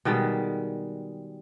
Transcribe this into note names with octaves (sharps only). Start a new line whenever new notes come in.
B2 D#3 G3 G#3